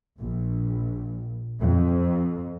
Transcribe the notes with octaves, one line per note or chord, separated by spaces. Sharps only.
A#1
F2